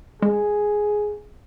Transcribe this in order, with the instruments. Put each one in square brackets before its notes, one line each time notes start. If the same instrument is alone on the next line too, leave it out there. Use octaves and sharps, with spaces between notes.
[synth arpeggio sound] G#3 [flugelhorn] G#4